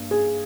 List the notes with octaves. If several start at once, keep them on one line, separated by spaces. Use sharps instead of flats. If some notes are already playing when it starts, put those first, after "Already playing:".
Already playing: G2 A#3
G#4